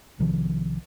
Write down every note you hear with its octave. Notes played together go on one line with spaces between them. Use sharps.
B1 C3 D#3 F3